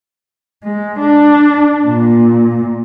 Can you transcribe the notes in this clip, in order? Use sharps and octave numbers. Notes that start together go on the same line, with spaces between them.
G#3
D4
A#2